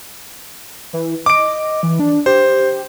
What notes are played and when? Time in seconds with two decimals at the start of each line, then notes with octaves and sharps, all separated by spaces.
0.93 E3
1.26 D#5 D6 D7
1.83 E3
1.99 D4
2.26 G4 C5